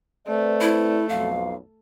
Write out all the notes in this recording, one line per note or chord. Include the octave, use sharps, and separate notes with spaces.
A3 C4 B4 D5
E4
B1 F2 F5